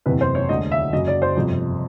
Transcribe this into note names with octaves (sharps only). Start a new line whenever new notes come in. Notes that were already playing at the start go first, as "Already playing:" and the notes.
F#1 E2 C3 B4
C5
C#5
E1 D2 D3 D#5
E5
F#1 F#2 C#3 F#3 D#5
D5
C5
G1 F2 C3